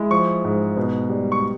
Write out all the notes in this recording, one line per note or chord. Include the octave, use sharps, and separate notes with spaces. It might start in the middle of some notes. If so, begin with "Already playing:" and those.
Already playing: G#3 E4
F3 C#6
G#2
B2
G3
C#6